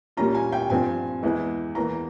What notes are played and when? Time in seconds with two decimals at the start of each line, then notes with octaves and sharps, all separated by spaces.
0.17 A#2 G3 A#3 C#4 F4 A#5
0.35 G#5
0.52 G5
0.70 G2 F3 C4 G#5
1.23 E2 E3 G#3 E4
1.75 E2 E3 A#3 A#5